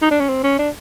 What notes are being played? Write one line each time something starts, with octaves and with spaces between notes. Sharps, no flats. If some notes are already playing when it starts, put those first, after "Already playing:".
D#4
D4
C#4
C4
C#4
D4